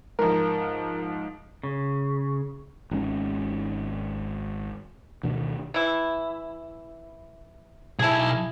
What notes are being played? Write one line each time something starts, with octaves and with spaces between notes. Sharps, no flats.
G#2 F3 A#4
C#3
G#1 G#3 C#4
D2 B2 D3 D#3
E3 E4
B1 E4 G#4 A5